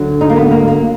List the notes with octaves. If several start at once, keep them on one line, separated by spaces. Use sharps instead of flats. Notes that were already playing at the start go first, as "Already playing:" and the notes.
Already playing: D2 D3 F#3
D#4
A#3
B3
A#3
A#3